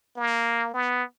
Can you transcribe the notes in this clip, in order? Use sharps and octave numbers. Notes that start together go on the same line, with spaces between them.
A#3
B3